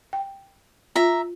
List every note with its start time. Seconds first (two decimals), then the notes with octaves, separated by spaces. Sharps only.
0.13 G5
0.96 F4 E5 A#5